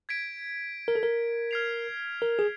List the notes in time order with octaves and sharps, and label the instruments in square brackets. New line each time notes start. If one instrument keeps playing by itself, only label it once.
[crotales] G#6 B6 D7
[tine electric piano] A#4
A4
A#4
[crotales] F6 G#6 C7 F7
[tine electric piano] A#4
G#4